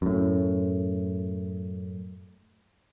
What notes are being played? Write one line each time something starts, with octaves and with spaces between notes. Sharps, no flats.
F#2 A2